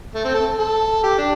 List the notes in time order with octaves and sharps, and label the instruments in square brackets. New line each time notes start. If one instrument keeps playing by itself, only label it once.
[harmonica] A3
C4
A4
A4
G4
D4